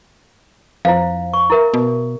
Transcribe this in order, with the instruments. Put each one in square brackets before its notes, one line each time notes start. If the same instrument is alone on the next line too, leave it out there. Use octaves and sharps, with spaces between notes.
[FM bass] F2 [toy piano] E4 C5 F5
[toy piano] C#6
E4 A#4 E5
[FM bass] B2